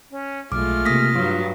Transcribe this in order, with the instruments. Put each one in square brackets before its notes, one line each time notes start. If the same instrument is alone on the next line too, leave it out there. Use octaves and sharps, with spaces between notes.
[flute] C#4
[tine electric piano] B1 [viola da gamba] G#3 A3 F4 [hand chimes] D6 [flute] F6
[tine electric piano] C3 A#3 [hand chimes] D#6 A#6 B6
[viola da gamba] G2 F#3 [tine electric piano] F4